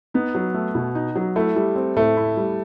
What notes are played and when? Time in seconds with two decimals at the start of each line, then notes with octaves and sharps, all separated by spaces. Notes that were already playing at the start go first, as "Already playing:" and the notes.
0.14 B3 D#4
0.35 F#3
0.54 A3
0.75 B2
0.95 D#4
1.16 F#3
1.36 A3 E4
1.56 G3
1.76 C4
1.96 A2 A3
2.17 E4
2.37 G3